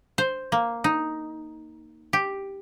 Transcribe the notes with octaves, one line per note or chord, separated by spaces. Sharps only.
C5
A#3
D#4
G4